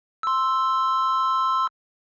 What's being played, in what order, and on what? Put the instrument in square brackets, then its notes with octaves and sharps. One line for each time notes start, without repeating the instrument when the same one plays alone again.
[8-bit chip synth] C6 E6